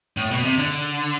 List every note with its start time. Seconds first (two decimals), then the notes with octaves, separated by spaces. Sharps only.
0.17 A2
0.31 B2
0.44 C3
0.58 D3